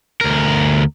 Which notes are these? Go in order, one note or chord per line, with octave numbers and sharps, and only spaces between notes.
D2 A#4